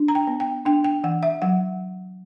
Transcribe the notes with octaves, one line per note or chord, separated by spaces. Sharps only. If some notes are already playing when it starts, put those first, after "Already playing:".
Already playing: D4
A#5
G5
B3
G5
D4 G5
G5
E3 F#5
E5
F#3 F#5